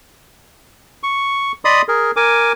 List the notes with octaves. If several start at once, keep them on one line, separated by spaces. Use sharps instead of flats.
C#6
D5 D#5 B5 C6 D#6
G#4 A#4
A#4 G#5 D6